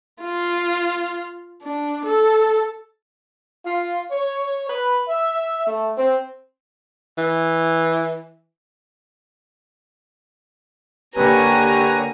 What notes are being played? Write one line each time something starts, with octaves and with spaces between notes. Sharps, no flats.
F4
D4
A4
F4
C#5
B4
E5
A3
C4
E3
D3 A#3 G4 B4 C#5 G#5 A#5